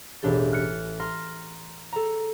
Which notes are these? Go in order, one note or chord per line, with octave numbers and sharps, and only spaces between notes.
E1 A1 D4 E4 G4 A6
F6 F#6 A6 B6 C#7
A#5 C6 F6 A#6
A4 A#5